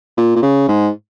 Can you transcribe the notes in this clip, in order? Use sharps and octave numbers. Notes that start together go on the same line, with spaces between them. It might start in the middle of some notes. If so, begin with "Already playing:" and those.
A#2
A#2
C#3
G#2